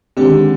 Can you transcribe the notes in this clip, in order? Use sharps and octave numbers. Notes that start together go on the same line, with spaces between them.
D3 D#3 G#3 C4 G4